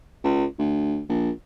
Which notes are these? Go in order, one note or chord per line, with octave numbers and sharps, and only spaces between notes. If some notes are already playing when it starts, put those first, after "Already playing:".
C#2
D2
A#1